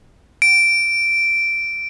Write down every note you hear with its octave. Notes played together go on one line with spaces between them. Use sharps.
D7